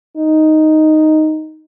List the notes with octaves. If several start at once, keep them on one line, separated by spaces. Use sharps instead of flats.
D#4